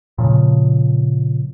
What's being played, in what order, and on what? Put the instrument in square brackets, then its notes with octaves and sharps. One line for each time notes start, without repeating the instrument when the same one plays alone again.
[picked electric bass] A#2 C#3 F3